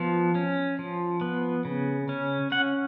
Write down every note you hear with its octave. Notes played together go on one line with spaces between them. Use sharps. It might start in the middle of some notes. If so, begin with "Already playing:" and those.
Already playing: F3 B3
C#4
F3
B3
C#3
C#4
C#4 F#5